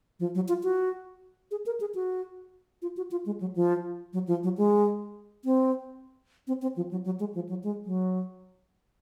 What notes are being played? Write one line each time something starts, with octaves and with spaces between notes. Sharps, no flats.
F3
F#3
F4
F#4
G#4
A#4
G#4
F#4
F4
F#4
F4
G#3
F#3
F3
F#3
F3
F#3
G#3
C4
C4
C4
F3
F#3
F#3
G#3
F3
F#3
G#3
F#3